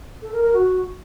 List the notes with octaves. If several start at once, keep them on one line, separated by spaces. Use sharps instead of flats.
A4
A#4
A#4
F#4